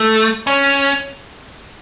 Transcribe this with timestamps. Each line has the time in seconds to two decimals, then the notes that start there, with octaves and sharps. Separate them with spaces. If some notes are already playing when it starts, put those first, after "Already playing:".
Already playing: A3
0.47 C#4